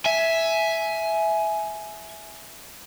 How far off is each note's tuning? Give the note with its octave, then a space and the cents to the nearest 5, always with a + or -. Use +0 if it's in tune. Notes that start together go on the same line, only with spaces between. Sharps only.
E5 +0 G#5 +15